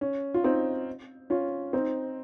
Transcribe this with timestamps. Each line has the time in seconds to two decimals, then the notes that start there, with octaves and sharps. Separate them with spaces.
0.01 C#4
0.34 F4
0.44 C4 D#4
1.30 C#4 F4
1.73 C4 D#4